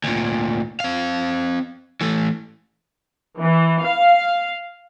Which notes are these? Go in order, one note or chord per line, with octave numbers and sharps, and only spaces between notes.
D2 A#2
C4 F5
E3 A3
E3
F5